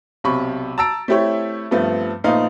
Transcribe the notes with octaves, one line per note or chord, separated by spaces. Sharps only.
B1 C3 B5 C#6
A5 A#5 E6 A6 D7
A3 C4 E4 G4 C#5
G2 F3 A3 B3 C4
A#1 A3 B3 D#4 F5